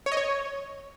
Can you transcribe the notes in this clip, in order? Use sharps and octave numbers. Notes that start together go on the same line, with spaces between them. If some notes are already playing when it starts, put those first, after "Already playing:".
C#5
D#5
C#5